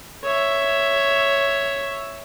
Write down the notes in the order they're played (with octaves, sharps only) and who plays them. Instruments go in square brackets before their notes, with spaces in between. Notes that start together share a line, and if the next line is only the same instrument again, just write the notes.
[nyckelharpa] C#5 E5